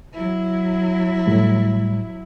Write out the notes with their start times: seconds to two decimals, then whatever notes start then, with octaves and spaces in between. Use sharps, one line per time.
0.13 F#3 E4
1.27 A2 G3